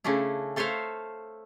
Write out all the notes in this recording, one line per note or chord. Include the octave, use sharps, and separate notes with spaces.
C#3 A3 C#4 D4 E4
A3 A4 C5 C#5 E5 F5